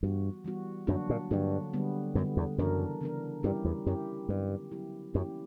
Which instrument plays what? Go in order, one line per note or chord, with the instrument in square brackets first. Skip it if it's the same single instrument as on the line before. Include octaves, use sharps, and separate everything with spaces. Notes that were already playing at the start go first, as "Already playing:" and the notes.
[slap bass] G2 [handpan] E3 G3 B3 F#4
[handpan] E3 G3 B3 F#4
[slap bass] F#2 [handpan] D3 F#3 A#3 D4 F#4
[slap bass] A#2
[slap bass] G2 [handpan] D3 F#3 A#3 D4 F#4
[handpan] D3 G3 B3
[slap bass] F#2 [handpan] D3 G3 B3
[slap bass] E2
[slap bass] F#2 [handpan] C#3 E3 B3 D4 A#4
[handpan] C#3 E3 B3 D4 A#4
[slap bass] G2 [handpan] G3 C#4 E4 G4 A#4
[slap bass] E2
[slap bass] F#2 [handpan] G3 C#4 E4 G4 A#4
[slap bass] G2 [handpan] D3 F#3 B3 E4 G4
[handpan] D3 F#3 B3 E4 G4
[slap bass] F#2 [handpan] E3 A#3 C#4 E4 G4